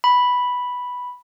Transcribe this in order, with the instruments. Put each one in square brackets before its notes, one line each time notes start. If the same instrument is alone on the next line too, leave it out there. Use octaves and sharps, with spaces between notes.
[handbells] B5